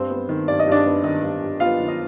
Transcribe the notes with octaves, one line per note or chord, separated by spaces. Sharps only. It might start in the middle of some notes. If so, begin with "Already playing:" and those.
Already playing: G2 C4 C5
B3
D#3
G2 D5
D#5
G2 D4 D5
B3
D#3 D#4 D#5
G2
G2
B3 F4 F5
D#3
D#4 D#5